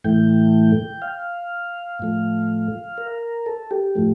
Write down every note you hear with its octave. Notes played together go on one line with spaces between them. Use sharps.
A2 E3 A3 G5
F5
A2 F3 A3
A#4
A4
G4
A2 F3 A3